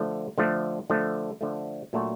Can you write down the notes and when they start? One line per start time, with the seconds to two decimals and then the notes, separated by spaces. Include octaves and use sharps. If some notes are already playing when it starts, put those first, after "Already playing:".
Already playing: D3 F3 A3
0.38 D3 F3 A3
0.90 D3 F3 A3
1.41 D3 F3 A3
1.93 A#2 F#3 A3 D4 F#4